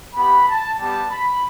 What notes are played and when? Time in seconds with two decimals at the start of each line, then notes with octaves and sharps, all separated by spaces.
0.15 B3 G4 B5
0.47 A5
0.78 G3 B3 G4 A5
1.10 B5